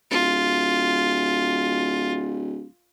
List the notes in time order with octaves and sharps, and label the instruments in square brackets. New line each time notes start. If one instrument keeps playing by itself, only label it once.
[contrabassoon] D1 [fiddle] F4